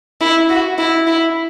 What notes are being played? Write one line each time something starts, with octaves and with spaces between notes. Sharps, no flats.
E4
F#4
E4
E4